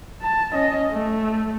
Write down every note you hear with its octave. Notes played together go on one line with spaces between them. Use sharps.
A5
C#4 D#5
A3